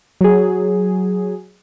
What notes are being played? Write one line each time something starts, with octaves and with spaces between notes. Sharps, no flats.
F#3 G#4